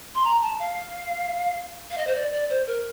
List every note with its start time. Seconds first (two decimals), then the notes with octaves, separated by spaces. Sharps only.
0.15 C6
0.24 A#5
0.42 A5
0.60 F5
1.91 F5
1.98 D#5
2.07 C5
2.15 D5
2.33 D5
2.50 C5
2.67 A#4